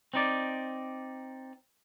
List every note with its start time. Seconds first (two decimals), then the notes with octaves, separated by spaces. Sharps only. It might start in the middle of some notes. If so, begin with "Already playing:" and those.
0.14 C4 D#4 D5